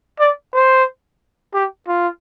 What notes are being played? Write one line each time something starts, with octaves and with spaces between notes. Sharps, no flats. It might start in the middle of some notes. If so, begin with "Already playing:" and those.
D5
C5
G4
F4